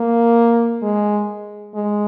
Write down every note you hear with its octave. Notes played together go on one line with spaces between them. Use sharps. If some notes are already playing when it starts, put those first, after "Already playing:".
Already playing: A#3
G#3
G#3